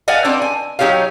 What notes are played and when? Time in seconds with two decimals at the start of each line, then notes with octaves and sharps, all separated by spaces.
0.08 B4 D5 D#5 F5 F#5 G#5
0.25 B3 C4 D4
0.42 G#5
0.79 F#3 D#4 G4 C#5 F5